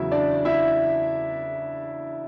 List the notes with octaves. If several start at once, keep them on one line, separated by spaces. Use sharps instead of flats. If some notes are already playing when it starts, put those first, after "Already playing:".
Already playing: E2 C#3 F#3 E4 E5
D4 D5
E4 E5